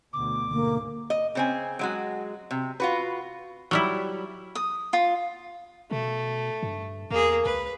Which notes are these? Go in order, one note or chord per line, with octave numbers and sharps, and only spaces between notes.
D2 B2 D6
G#2 B2 D3 A#3
D#5
C#3 C4 G#5
F#3 G#3 F#4
C3
F4 F#4 B4
F#3 G3 E4
D#6
F4
B2 A3
G2
E2 A#3 G#4
C#2 B4